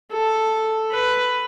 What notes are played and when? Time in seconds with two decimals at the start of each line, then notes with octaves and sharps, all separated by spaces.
0.12 A4
0.92 B4